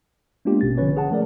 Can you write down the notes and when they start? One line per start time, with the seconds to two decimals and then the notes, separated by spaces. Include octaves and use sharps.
0.45 G#3 A#3 B3 D4 F4 G4
0.61 A1 B2 C#4 A6
0.78 D3 F3 C#4 B4 C#5
0.97 G#4 F#5 A5
1.11 F3 A3 A#4 D5